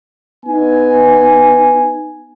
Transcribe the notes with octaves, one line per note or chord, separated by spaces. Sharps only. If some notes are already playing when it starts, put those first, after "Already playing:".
B3 D#4 G#5